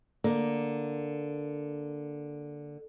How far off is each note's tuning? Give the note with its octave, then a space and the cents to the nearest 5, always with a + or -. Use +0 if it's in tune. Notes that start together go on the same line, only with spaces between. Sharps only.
D3 +0 A#3 +0